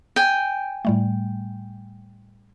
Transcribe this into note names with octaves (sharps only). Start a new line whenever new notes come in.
G5 G#5
A2 G3 A3